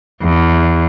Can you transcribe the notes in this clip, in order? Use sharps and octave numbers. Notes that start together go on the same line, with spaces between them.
E2